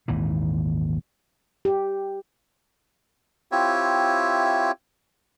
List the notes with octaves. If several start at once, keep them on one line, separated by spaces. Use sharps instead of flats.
G#1 D#2 A#2 E3
G4
C4 E4 F4 G4 C#5 E5